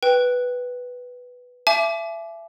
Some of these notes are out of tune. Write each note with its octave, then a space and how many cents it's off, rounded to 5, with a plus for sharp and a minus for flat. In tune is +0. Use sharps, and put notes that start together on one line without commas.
B4 +0 G5 +0
E5 +25 G#5 +45 D6 +0